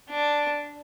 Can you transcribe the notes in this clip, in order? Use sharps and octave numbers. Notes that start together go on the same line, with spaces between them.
D4